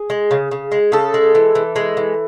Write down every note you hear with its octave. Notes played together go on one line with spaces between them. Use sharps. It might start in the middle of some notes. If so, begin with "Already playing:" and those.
Already playing: G#4
G#3
C#3
C#3
G#3
C#3 A4
G#3
E3
E3
G#3
E3